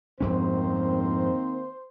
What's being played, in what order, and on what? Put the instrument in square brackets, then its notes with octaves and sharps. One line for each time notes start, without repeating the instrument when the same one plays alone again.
[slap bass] F2 G#2 C#4 [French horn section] D#3 A#3 C4 [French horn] C5